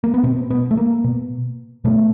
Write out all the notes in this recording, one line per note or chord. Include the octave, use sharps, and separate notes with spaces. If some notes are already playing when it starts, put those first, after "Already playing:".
A#3
B3
B2 C4
B3
A3
A#3
B2
B2 A3